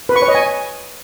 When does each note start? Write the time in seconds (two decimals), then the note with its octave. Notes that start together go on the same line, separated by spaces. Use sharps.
0.09 B4
0.16 C#6
0.22 C#5
0.28 D#5
0.35 G#5